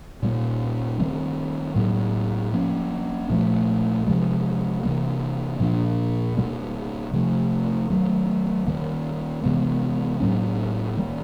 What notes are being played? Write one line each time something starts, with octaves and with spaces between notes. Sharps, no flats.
A#2 G3 A#3
D#3 G3 C4
A2 F#3 A#3
F3 A#3 C#4
A#2 F3 A3
C3 F3 G#3
C3 E3 G3 A#3
A#2 F3 A#3 D4
B2 G3 A#3
C3 F3 A3
D#3 F#3 A3
D#3 G3 A#3
C3 E3 G#3 B3
A2 F#3 A#3 C#4
D#3 G3 A#3